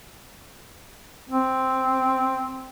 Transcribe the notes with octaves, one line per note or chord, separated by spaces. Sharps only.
C4